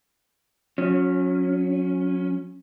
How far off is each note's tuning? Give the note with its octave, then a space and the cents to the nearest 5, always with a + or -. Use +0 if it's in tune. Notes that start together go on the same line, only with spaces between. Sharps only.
F#3 -30 C#4 +0